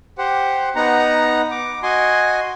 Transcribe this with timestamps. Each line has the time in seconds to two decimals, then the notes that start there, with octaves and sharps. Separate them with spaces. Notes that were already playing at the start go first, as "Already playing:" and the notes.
0.18 G4 C5 F#5
0.76 B3 D#4 F#5 A#5
1.51 D6
1.83 F#4 D#5 G#5 C6